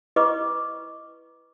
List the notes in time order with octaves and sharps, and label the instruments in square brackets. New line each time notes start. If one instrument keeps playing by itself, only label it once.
[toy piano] E4 B4 D#5 C#6 D6